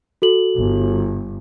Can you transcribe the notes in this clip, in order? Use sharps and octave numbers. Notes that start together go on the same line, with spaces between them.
F#4 A4 F#7
G1